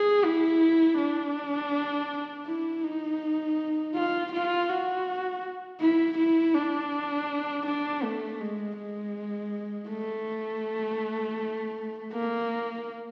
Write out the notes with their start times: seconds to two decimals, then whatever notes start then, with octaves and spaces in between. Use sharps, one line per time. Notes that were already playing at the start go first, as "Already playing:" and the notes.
Already playing: G#4
0.24 E4
0.98 D4
2.47 E4
2.84 D#4
3.95 F4
4.32 F4
4.69 F#4
5.81 E4
6.18 E4
6.55 D4
7.66 D4
8.03 A3
8.41 G#3
8.78 G#3
9.89 A3
12.12 A#3